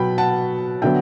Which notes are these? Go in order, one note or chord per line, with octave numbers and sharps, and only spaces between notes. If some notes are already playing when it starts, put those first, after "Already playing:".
Already playing: B2 F#3 B3 G5 B5
F#5 A5
D3 F#3 B3 E5 G5